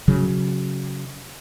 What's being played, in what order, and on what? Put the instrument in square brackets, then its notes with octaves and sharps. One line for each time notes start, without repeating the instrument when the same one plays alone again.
[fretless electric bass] C#3 F#3